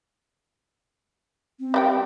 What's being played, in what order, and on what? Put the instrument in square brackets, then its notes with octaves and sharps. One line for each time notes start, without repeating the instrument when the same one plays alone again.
[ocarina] C4
[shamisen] G3 G4 G5